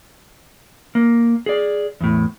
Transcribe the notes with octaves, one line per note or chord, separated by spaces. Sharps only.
A#3
G#4 D5
E2 A2